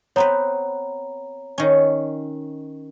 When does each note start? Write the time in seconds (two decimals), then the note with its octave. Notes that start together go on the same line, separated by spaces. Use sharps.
0.16 B3 C4 B4 C#5 A#5
1.58 D#3 C#4